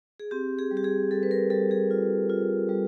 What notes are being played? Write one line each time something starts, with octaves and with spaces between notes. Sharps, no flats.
G#4
C4 G4
G#4
G3
G4
G#4
G3 A4
B4
A#4
G3 A4
G#4
F4
F4
G3